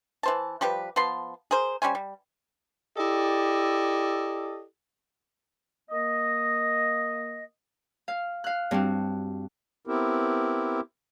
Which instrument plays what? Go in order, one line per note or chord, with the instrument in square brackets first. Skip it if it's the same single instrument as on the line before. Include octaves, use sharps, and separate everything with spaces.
[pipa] E3 C5 A5
F3 G3 G4 B4
F3 B3 A5 C6
G#4 A#4 C5
G3 C#4 C5 G#5
G3
[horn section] E4 G4 A4 D5 D#5
[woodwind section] A#3 D#5
[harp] F5
F5 F#6
G2 C4 F#4 G4
[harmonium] B3 C4 E4 G4 A#4